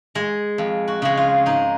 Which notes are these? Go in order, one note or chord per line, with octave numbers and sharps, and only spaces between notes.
G#3
F2
F#4
C#3 G#3
F4
G#2 D#4